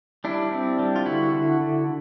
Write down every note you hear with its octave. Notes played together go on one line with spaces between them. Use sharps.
G3 D4 E4
C4
G3
F4
D3 E4 F#4
D3
D3